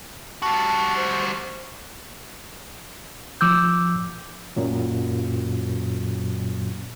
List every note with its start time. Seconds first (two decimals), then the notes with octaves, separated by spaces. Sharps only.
0.42 G3 F#4 A5
0.96 C5
3.41 F3 D6 E6 G6
4.56 F#2 A#2 F#3